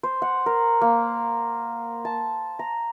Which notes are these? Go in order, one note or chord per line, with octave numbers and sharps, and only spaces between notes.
C5
F#5
A#4
A#3
A5
A#5